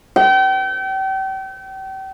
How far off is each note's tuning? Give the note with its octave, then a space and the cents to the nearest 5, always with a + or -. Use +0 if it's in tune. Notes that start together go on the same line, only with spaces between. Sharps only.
G5 -35